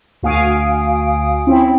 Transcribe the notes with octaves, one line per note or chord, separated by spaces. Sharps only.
D2 F#4 F5 G#5 D#6 D7
C4 C#4 E4